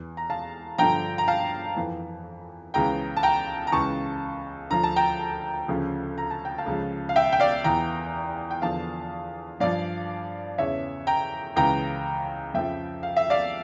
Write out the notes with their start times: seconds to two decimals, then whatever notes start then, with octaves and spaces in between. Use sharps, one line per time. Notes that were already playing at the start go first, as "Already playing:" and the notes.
Already playing: E2 E3
0.17 A#5
0.30 F5 A5
0.78 G2 D3 F3 G5 A#5
1.18 A#5
1.28 F5 A5
1.76 F2 E3
2.74 C#2 C#3 E3 G5 A#5
3.17 A5
3.23 G5 A#5
3.67 A#5
3.72 C#2 C#3 E3 A5 C#6
4.70 D2 D3 F3 A#5
4.84 A5
4.96 G5 A#5
5.68 D2 C#3 F3
6.18 A#5
6.31 A5
6.45 G5
6.58 F5 A5
6.66 C#2 C#3 F3
7.09 F5
7.16 E5 G5
7.32 G5
7.40 D5 F5
7.64 E2 E3 G5 A#5
8.51 G5
8.62 E2 D3 F3 F5 A5
9.60 G2 F3 D5 F5
10.58 E2 C#3 E3 C#5 E5
11.07 G5 A#5
11.56 C#2 C#3 E3 G5 A#5
12.54 F2 C#3 F3 E5 G5
13.03 F5
13.16 E5
13.30 D5 F5